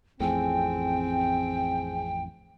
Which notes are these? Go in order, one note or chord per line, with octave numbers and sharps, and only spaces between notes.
A1 F2 A2 C4 G#4 G5 G#5